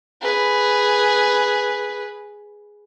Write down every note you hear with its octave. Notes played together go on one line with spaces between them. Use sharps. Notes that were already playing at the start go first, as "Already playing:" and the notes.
G#4 B4